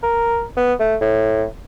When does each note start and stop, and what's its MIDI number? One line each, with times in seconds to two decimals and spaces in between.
0.03 0.44 70
0.57 0.74 59
0.80 0.96 57
1.01 1.45 45